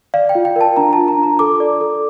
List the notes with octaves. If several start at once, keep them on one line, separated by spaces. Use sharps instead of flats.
D5 F5
G5
F4
G5
A#4 A5
D4 A#5
A5
F4
A#5
D4
A#5
A4 D6
D5
A4